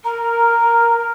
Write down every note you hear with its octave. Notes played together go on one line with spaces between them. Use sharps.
A#4 A#5